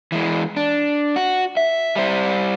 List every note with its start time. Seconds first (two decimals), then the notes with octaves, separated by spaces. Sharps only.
0.12 E3 G#3
0.57 D4
1.16 F#4
1.57 E5
1.95 G3 C5